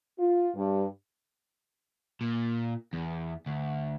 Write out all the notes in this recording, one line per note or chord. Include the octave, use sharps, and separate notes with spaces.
F4
G2
A#2
E2
D2